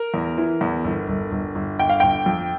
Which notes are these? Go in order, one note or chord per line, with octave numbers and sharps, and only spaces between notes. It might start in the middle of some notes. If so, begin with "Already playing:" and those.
Already playing: A#4
E2
E3
E2
G1
G1
G1
G1
G1 G5
F5
G1 G5
F2